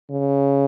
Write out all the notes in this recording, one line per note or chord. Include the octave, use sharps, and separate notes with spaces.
C#3